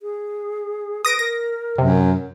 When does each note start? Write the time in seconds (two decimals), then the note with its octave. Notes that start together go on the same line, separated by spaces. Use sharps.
0.02 G#4
1.05 B4 D#6 A#6 D7
1.19 A#4 A#6
1.78 F#2 C3